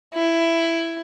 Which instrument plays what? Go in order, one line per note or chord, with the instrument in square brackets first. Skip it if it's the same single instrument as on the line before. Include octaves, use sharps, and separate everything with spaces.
[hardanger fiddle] E4